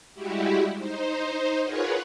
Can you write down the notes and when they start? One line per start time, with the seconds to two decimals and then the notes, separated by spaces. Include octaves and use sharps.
0.14 G3 G#3 E4 F#4 G4
0.77 D#4 C5
1.63 F4 G#4 A#4 B4 C#5 F#5